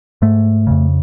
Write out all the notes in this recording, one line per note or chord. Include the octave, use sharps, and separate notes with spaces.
G#2 A3
F2 C#3